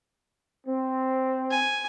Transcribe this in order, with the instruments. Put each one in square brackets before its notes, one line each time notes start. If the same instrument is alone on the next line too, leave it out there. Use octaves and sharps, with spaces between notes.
[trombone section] C4
[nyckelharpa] G#5